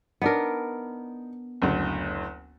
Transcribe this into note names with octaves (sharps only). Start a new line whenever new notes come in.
B3 D4 D#4 A#4
F#1 D2